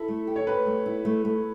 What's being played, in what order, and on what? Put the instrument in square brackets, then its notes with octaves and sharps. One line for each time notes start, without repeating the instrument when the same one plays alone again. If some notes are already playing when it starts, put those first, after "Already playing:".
Already playing: [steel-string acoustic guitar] E4 [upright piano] A4
[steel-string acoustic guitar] A3
G4
[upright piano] C#5
[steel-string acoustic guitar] G4 [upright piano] B4
[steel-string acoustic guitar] A3
E4
A3
A3